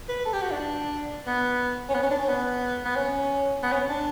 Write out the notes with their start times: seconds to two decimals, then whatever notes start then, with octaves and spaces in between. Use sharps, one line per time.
0.09 B4
0.25 A4
0.33 G4
0.42 F#4
0.51 D4
1.27 B3
1.89 C#4
1.95 B3
2.03 C#4
2.11 D4
2.20 C#4
2.28 B3
2.85 B3
2.96 C#4
3.63 B3
3.72 C#4
3.89 D4